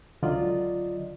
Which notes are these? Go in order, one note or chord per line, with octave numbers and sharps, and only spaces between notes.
C#2 D3 F#3 F4 D5 D#5